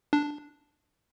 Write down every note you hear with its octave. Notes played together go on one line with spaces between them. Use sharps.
D4